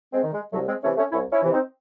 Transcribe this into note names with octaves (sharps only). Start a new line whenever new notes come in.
G#3 C4
D#3
G#3
C2 F#3 A3
G#3 C4
C3 E3 A3 C#4
A3 C#4
C2 C#4 E4
C#4 E4
C3 E3
C4 D#4